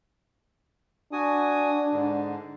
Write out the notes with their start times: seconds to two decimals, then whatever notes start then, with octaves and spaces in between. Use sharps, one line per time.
1.13 D4 F#4 G#5 D#6
1.93 G#2 D3